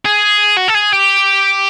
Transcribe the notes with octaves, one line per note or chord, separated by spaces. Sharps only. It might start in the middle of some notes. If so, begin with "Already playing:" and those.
G#4
F#4
A4
G#4
G4